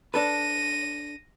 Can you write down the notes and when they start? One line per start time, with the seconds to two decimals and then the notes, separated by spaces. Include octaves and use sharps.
0.14 D4 A4 B4 A#6 D#7